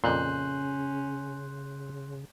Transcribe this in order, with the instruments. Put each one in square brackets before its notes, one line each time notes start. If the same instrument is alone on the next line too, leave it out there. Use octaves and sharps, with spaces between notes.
[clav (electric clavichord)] F2 A#2 [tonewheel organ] C#3 [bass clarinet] C#4 [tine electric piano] C6 F#6 G6